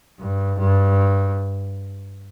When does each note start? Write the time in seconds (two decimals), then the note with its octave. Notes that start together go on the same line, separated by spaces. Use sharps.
0.19 G2
0.59 G2